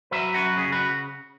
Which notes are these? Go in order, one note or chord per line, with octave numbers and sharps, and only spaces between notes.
F#3 B4 E5
F#2 F#4 B4
C#3 G#4
F#4 B4